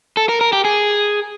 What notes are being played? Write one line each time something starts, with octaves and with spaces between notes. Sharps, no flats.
A4
A#4
A#4
G4
G#4